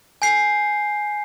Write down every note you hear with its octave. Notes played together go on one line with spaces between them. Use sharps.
G#5 G6 C7